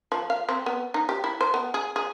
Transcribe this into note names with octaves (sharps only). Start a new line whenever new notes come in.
F3
F5
C4
B3
D#4
G4
E4
C5
B3
G#4
G#4